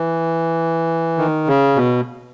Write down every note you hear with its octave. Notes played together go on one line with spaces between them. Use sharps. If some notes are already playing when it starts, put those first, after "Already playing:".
Already playing: E3
D#3
C#3
B2